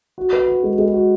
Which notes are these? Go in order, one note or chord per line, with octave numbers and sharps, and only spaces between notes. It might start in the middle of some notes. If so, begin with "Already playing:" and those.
F#4
B4
F#4
G#3
G#3
F#4